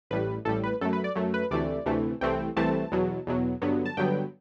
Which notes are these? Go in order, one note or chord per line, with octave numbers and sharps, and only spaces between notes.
A1 A2 G3 B4
A1 A2 G3 A4
B4
F#2 F#3 A3 A4
B4
D5
F#2 F#3 A3
B4
D2 C3 E3 A3 D5
D2 C3 E3 A3
C2 C3 E3 A3 C4 G5
C2 C3 E3 A3 C4 A5
E2 B2 F#3
E2 B2 F#3
G2 D3 F#3 B3
A5
G2 D3 F#3 B3 G5